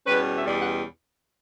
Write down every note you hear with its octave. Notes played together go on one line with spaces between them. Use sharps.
E2 B2 G3 C#4 B4
E5
E2 B2 G3 C#4 D5
F#5